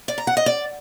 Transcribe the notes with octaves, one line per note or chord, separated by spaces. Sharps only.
D5
A#5
F#5
D#5
D5